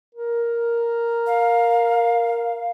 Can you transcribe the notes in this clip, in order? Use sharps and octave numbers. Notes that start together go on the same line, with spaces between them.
A#4
F5